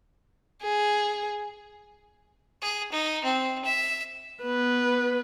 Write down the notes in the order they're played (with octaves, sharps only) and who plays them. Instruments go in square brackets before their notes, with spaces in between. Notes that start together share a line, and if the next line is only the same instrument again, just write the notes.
[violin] G#4
[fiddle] G#4
D#4
C4
E5
[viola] B3 B4